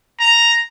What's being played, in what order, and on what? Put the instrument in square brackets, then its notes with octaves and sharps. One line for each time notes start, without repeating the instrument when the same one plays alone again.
[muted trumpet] A#5